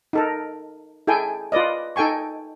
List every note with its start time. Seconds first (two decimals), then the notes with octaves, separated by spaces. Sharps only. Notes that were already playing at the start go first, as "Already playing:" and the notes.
0.13 D#4 A4 A#4
1.07 E4 G#4 A4 G5 G#5
1.52 F4 B4 D5 D#5
1.96 D#4 A4 G5 G#5 C#6